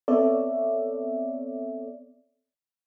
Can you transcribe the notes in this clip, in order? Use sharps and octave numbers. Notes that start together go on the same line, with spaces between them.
B3 C4 A4 C#5 D5 E5